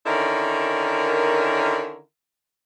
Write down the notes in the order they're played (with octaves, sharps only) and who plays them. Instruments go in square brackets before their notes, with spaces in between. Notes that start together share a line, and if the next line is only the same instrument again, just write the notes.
[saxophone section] D3 D#3 C#4 E4 A#4